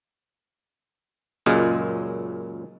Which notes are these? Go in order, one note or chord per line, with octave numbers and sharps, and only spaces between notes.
C#2 F#2 A#2 G#3